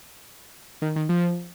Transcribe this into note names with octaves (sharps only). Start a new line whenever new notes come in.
D#3
D#3
F3